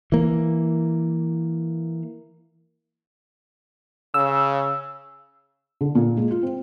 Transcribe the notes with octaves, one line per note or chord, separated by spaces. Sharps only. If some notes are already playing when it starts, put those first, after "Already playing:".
E3 A#3
C#3 E6
D3
A#2
G#3
F4
C4